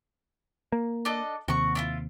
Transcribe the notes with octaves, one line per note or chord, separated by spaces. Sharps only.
A#3
D4 A4 D#5
D#2 C3 F#4 C#6
D4 E4 F4